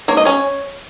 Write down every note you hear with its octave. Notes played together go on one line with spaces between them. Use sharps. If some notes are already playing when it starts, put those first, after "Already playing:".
A#3 C#5
D#5
C#4 C#5